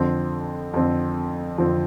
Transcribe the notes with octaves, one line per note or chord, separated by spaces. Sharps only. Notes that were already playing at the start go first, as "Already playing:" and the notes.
Already playing: F2 D3 F3 C4
F2 D3 F3 C4
F2 D3 F3 C4